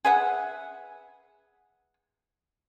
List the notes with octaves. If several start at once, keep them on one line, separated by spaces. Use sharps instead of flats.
G#4 B4 E5 F#5